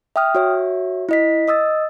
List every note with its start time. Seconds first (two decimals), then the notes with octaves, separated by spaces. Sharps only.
0.16 E5 G5 D#6 F6
0.35 F#4 C#5 E5
1.09 E4 D#5 B6
1.48 D#5 D#6 E6 A6